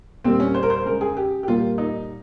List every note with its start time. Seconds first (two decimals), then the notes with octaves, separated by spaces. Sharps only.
0.24 A#2 G3 A#3 C4
0.40 C#4
0.54 C5
0.63 A#4
0.70 C5
0.85 C#3 G#3 A#4
1.01 G#4
1.17 G4
1.43 G4
1.47 A#2 G3 A#3 F4
1.78 D#4